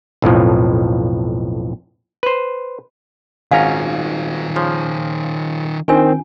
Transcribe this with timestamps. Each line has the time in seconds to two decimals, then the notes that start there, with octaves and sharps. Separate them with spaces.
0.22 B1 F2 A2 F3
2.23 B4 C5
3.51 G#1 D#3 C#4 F4 F5 F#5 G#5 A#5
4.56 C#3 F3
5.88 D#3 C4 D4 F4 G5 G#5